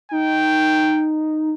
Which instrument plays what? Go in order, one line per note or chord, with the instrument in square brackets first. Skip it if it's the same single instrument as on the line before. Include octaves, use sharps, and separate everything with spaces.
[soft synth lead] D#4 [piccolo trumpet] G5